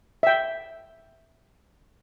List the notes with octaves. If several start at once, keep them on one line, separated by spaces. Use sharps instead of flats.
E5 G5